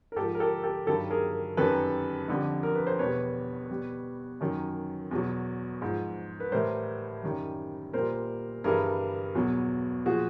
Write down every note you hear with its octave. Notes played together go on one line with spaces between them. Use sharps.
A#4
G#2 F3 G4 A4
A#4
G4 A4
G4 A4
G2 D#3 F#3 G4 A4
G#4 A#4
F#2 D#3 G3 A4 B4
F2 D3 G3
A#4
B4
C5
E2 B2 G3 B4 C#5
B2 G3
F#2 D#3 F#3
E2 B2 F#3
G#2 F3
B4
A2 E3 G3 A#4 C5
F#2 D#3 G3
A#2 G3 A#4 C5
G2 E3 G3 G#4 A#4
E2 B2 F#3
A#2 F3 F#4 G#4